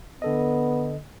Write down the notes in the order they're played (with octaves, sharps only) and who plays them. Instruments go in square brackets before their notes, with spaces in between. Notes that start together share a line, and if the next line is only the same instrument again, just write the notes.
[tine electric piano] D3 A4 D#5 [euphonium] B3